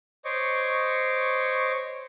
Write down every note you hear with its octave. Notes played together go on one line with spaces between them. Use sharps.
C5 C#5 D#5 C#6 D6